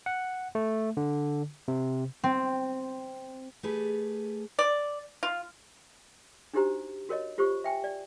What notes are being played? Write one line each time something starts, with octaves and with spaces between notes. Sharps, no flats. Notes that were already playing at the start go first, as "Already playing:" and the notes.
F#5
A3
D3
C3
C4
A3 G4 G#4 B4
D5
F4
D4 D#4 F#4 G4 C5 A#5
F#4 A#4 C#5 D#5
F4 G4 C5 B5 C#6
E5 G5 G#5
D5